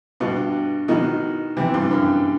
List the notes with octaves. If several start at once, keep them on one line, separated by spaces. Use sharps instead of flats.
G2 B2
B2 D#3
C3 E3
G2
F#2